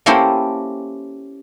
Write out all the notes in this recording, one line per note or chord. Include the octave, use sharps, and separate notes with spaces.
A#3 C#4 E4 G4 A4 C5